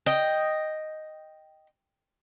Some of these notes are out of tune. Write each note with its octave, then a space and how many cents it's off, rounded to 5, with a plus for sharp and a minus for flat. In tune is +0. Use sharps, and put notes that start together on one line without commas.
D#5 +0 G5 +0